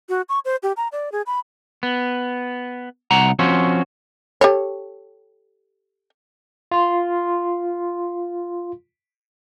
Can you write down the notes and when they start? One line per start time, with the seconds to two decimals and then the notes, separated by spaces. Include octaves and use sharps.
0.09 F#4
0.29 C#6
0.45 C5
0.63 G4
0.77 A#5
0.92 D5
1.12 G#4
1.27 B5
1.83 B3
3.11 C2 F#5 A#5
3.39 F3 C4 C#4 F#4
4.41 G4 A4 C#5
6.72 F4 C6